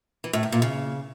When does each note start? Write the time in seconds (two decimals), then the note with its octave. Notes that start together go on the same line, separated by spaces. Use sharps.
0.24 E3
0.33 A2
0.43 D#3
0.52 A#2
0.62 C#3